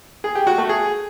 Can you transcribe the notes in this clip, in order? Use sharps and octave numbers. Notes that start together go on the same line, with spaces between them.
G#4
G4
F#4
A3
G#4